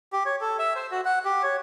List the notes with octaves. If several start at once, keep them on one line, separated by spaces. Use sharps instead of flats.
G4
C#5
A4
E5
C5
F#4
F#5
G4
C#5